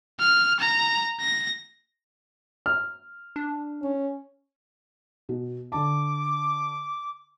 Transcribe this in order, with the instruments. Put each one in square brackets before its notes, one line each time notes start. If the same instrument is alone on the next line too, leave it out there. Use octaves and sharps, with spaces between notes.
[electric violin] F6
A#5
A#6
[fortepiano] F6
[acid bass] D4
[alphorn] C#4
[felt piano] B2
[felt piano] D3 A5 [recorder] D6